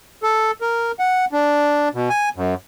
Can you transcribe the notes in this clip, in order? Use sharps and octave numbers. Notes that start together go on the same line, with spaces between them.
A4
A#4
F#5
D4
B2
G#5
F#2